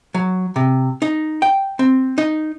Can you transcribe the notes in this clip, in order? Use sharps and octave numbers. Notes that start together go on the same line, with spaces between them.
F#3
C3
D#4
G5
C4
D#4